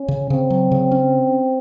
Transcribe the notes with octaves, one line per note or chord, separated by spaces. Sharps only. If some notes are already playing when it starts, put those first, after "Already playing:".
Already playing: C#4
C#3
C#3 C4
F#3
C#3
C#4